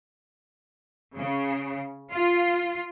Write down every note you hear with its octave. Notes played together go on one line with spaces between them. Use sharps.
C#3
F4